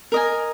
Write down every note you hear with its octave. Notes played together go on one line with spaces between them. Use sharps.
A#4 D#5 G#5